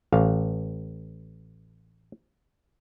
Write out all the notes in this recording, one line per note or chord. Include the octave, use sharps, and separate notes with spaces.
A1 F5